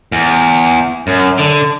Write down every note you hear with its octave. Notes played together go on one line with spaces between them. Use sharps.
E2
F#2
D3